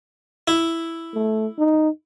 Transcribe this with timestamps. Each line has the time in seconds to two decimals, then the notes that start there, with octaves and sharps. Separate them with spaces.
0.48 E4
1.14 A3
1.58 D#4